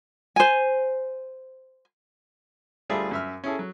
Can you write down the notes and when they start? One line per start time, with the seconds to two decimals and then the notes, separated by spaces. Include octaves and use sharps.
0.36 C5 G#5
2.90 D2 G3 F4 G#4 A4 E5
3.11 F#2 E5 F6
3.44 C#4 E4 G#4 A4
3.59 F#3